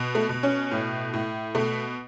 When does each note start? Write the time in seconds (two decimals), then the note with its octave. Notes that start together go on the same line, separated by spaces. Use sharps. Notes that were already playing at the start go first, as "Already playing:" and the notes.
Already playing: B2
0.15 A3
0.29 B2
0.43 C#4
0.71 A2
1.13 A2
1.55 B2 A3